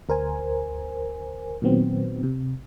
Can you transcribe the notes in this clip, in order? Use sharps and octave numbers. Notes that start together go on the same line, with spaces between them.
D2 A#4 C5 G#5
A#2 D#3 F#3 B3 C4
C3